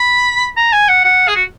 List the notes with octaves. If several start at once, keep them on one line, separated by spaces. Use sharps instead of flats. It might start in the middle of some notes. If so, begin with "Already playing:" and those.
Already playing: B5
A#5
G#5
F#5
F#5
G#4
F#4